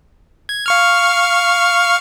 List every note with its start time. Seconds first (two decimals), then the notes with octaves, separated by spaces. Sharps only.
0.49 G#6
0.66 F5 C#6 F6